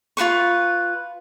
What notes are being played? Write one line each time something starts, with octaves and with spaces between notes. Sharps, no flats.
F4 G#4 B4 C#6